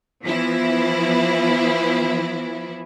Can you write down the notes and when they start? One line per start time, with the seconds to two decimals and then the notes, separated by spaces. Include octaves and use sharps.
0.24 E3 F3 B3 E4